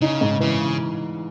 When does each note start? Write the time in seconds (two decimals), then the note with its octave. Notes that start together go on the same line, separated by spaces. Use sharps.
0.01 C#3 D#4
0.21 G#2
0.40 C#3 E3